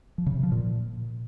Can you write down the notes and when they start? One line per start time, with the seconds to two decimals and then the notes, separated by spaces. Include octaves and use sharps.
0.18 F3
0.26 C#3
0.35 C3
0.43 F3
0.52 A#2